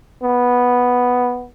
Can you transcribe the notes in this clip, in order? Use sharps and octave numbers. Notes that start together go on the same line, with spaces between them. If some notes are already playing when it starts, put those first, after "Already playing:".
B3